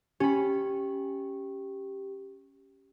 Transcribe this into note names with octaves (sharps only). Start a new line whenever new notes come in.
C#4 G4 B5